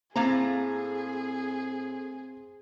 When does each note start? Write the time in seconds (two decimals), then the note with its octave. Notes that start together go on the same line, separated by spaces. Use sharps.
0.16 A2 A#3 C4 G#4 A#5